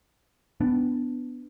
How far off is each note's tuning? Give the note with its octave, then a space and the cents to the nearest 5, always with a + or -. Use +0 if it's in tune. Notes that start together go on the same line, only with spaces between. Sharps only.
B3 +10 D4 +0